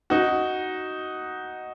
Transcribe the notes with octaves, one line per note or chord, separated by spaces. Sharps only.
D#4 F#4